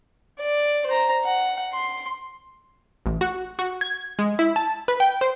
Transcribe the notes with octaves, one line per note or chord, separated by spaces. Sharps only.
D5
C5 A#5
F#5
C6
A1
F#4
F#4
G#6
G#3
E4
A5
B4
G5
C5